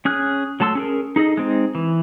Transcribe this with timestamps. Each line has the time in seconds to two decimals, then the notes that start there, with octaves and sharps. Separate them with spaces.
0.05 C#4 G#4 F6 F#6
0.60 F#3 A3 A5 C6 E6
0.75 C#4 G#4 A#4
1.16 D#4 G#4 A4 D#5
1.37 G#3 C4 D#4
1.75 E3